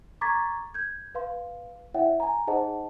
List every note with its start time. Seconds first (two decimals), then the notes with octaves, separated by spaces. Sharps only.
0.21 A#5 C#6 D6 G#6 A6 B6
0.74 G6 G#6
1.15 B4 F5 C6
1.94 E4 C#5 E5 F#5 G5
2.20 G#5 A#5
2.47 D#4 G#4 C5 D#5 F#5 A5